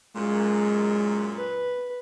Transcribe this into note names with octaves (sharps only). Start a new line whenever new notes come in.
F#2 A#2 G#3
B4